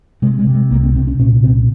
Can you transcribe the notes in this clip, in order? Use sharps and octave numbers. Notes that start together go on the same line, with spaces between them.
C3 G#3
G#3
C3
G#3
C2 A#3
C4
C3 C4
C#4
A#2 C#4
C2 C4